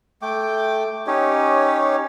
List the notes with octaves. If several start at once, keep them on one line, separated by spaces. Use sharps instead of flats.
A3 G5 D6
C#4 D#4 G4 C#5